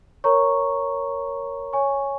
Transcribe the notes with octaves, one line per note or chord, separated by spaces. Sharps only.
A#4 C#5 A#5 C#6
C#5 G#5 C#6